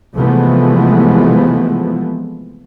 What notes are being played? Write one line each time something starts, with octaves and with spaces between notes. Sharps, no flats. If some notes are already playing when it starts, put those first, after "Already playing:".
C3 E3 F3 G#3 A3 B3